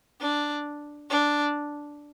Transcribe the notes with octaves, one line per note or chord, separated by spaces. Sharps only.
D4
D4